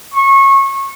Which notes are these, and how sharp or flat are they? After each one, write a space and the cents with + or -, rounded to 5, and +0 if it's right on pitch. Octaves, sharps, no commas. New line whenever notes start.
C#6 -25